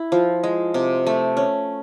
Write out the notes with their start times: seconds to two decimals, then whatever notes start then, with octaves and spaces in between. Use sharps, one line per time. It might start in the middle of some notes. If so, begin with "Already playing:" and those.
Already playing: E4
0.12 F3
0.43 G#3
0.74 C3
1.06 A3
1.37 C#4